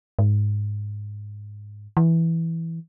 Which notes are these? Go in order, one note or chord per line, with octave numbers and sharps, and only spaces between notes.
G#2
E3